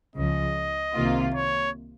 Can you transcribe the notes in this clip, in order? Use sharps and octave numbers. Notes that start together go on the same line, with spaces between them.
C#2 C#3 F3 D#5
C2 C3 D#3 A#3 F4
C#5